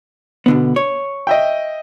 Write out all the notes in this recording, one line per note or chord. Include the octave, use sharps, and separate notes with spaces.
B2 D3 B3
C#5
D#5 E5 G5